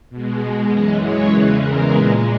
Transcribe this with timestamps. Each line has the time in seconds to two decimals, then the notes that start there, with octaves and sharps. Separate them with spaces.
0.10 B2 G#3
0.70 F#2 E3 G#3 D#5
1.01 C#5
1.30 E2 C#3 E3 G#3 B4
1.60 A#4
1.90 A#2 G#3 B4